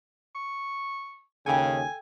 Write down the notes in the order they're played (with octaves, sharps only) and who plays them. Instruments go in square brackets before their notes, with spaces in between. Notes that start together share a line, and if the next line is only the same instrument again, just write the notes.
[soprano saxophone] C#6
[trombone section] D#2 C#3 [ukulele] A4 G5 [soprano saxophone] G#5